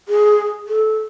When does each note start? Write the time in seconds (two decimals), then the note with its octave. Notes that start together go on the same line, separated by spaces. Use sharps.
0.08 G#4
0.68 A4